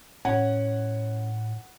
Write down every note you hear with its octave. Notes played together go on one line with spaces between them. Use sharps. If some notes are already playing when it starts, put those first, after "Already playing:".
A2 C#4 F#5